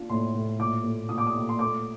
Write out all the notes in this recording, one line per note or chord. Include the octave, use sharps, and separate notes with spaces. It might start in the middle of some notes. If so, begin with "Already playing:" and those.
Already playing: D4 F4
A2 C6
A2
A#2 D6
A3
A#2 D#6
D6
D#6
A#2
C6
A3 D6